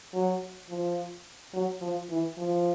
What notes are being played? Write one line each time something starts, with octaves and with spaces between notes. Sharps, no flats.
F#3
F3
F#3
F3
E3
F3